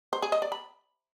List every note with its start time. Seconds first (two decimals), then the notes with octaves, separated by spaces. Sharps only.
0.13 C5
0.22 G#4
0.32 D#5
0.42 D5
0.52 B5